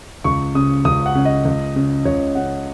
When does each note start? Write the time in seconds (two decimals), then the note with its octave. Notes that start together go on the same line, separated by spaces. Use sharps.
0.24 C#2 C#6
0.55 C#3 D#6
0.85 C#2 D#6
1.06 F#5
1.15 C#3
1.25 D#5
1.45 C#2
1.76 C#3
2.05 C#2 C#5
2.35 C#3 F#5